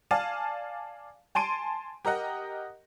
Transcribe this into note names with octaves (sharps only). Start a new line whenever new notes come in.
D5 F5 G#5 A5
G#5 A5 C6 D7 D#7
G4 A#4 D#5 F#5